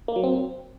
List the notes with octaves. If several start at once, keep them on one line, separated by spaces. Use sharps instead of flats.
A#3
F#3
C4